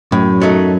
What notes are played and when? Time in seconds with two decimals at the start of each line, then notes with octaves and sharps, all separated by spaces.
0.12 F#2 A2
0.41 F#3 A3 D#4